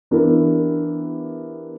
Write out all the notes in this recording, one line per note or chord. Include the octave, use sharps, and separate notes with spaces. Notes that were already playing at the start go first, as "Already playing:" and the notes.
E3 B3 D4 E4 G4 A#4